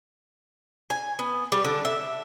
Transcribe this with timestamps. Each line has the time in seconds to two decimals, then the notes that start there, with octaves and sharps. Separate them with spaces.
0.90 G#5
1.19 B3
1.52 G3
1.65 D3
1.85 E5